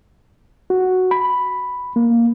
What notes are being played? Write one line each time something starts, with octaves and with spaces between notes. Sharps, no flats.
F#4
B5
A#3